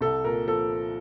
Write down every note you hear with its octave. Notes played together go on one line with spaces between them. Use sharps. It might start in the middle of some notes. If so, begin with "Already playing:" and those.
C2 A4
A#2 A#4
F3 A4